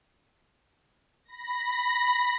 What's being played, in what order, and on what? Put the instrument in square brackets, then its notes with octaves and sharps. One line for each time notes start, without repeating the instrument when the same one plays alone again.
[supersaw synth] B5 A#6